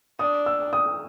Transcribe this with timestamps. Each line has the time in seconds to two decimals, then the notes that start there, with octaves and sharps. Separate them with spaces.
0.19 D4 D#6
0.46 E6
0.73 D#6